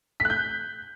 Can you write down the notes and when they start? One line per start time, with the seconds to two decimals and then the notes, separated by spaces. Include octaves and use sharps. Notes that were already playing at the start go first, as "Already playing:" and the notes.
0.20 B6
0.25 F#6
0.30 G6